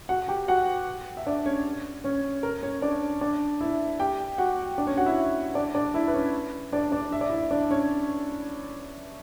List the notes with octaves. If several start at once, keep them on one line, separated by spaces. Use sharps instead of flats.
F#4 F#5
G4 G5
F#4 F#5
E5
D4 D5
C#4 C#5
C#4 C#5
A#4
C#4 C#5
D4 D5
D4 D5
E4 E5
G4 G5
F#4 F#5
D4 D5
C#4 C#5
F#4 F#5
E4 E5
D4 D5
D4 D5
E4 E5
B4
C#4 C#5
D4 D5
D4 D5
E5
D5
E4 E5
D4 D5
C#4 C#5